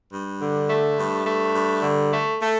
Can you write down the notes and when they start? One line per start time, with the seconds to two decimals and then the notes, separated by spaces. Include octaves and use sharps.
0.11 G2
0.39 D3
0.67 A3
0.97 G2
1.25 A3
1.53 G2
1.82 D3
2.12 A3
2.40 A3